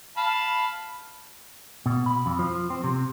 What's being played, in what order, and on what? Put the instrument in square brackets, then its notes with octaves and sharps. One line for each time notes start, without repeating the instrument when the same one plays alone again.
[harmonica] F5 A5 B5
[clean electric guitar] B2
B5
F2
F3
C4
C3